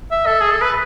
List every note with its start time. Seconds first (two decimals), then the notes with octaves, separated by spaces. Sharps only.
0.11 E5
0.26 A4
0.41 G#4
0.51 A4
0.62 B4